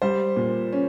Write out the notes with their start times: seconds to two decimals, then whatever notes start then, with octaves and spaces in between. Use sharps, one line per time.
0.02 G3 C5
0.36 A#2
0.73 C#4